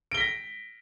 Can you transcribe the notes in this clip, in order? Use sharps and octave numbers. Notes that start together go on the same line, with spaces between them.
A#6 B6 D7 G7